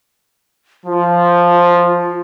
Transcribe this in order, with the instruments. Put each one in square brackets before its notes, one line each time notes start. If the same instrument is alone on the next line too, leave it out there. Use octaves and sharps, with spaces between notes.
[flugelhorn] F3 [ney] F4